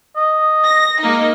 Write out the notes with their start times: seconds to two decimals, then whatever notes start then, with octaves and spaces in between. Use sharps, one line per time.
0.16 D#5
0.65 A#6
1.01 G#3 A#3 D#4